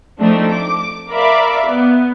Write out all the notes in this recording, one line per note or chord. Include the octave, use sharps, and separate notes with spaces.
F3 A3 C4 D4 D#4
D6
A#4 D5 E5 F5 B5 D6
B3